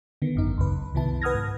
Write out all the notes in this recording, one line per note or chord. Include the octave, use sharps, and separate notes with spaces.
D3 D#3 B3
G#1 F#2 D#4
C#2 F#2 B4
C2 C3 D#3 B3 E4 A5
B4 F#5 D#6 F6 G#6 A#6
G#2